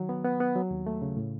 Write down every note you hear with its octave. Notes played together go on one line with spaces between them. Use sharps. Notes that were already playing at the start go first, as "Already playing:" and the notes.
Already playing: D#3 F#3
B3
B3
B3
F#3
D#2
A3
C#3
A2